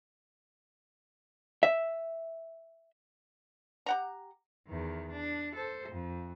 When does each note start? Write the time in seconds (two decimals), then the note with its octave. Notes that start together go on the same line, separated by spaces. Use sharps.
1.63 E5
3.86 G4 F#5 A#5
4.67 E2 D#3
5.11 D4
5.56 A4 C5
5.89 F2